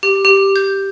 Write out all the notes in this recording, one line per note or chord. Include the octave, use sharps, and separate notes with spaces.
G4
G4
G6